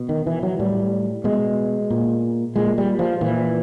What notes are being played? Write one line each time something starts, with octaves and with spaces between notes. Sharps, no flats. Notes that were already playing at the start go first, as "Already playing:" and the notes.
Already playing: B2
D#3
E3
F#3
A2 G3
B2 G#3
A#2
A#2 G#3
G3
F3
A#2 E3